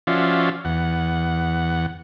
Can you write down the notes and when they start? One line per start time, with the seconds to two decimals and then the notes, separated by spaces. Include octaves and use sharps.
0.07 F3 C#4 F4 F#4 D5 E5
0.65 E2 F#5